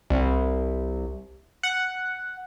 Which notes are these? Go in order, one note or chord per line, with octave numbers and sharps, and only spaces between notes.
C2
F#5